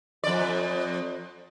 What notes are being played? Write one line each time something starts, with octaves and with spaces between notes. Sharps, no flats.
F2 D5